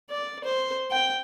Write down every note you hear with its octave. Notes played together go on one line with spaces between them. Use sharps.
D5
C5
G5